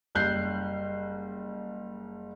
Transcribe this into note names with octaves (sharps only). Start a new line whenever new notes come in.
F#1 G3 F#6 G6 C7